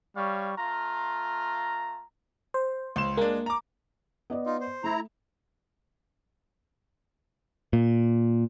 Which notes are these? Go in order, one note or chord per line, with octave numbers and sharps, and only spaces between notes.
G3 C#5 F5 C#6
A3 F4 A#5
C5
C#2 C6 E7
G#3 A#3 D4
A#5 D6
B3 D5 D#5
D#4 F4
C5
A3 E4 A#5
A#2